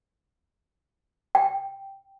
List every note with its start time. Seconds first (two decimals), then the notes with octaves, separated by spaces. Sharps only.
1.35 G5